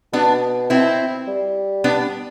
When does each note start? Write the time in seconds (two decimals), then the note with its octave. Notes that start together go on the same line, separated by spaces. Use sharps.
0.13 B2 B3 D4
0.70 C4 E4
1.27 G3
1.84 B3 D4